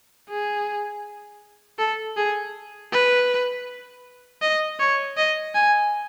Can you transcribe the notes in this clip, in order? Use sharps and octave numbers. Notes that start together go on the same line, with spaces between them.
G#4
A4
G#4
B4
D#5
C#5
D#5
G#5